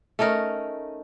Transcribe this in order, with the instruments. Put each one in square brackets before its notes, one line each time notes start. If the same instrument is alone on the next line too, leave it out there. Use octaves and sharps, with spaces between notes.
[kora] A3 C#4 D#4 A#4